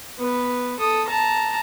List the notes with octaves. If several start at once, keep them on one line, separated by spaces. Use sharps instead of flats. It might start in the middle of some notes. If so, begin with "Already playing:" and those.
B3 B4
A4 D#6
A5 A#5